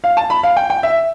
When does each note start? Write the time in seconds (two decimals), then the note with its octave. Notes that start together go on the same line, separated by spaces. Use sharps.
0.04 F5
0.17 A5
0.30 B5
0.43 F5
0.57 G5
0.70 G5
0.83 E5